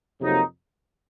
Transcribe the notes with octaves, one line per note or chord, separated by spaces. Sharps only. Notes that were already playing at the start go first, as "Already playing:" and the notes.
F2 C3 F#3 A#3 D#4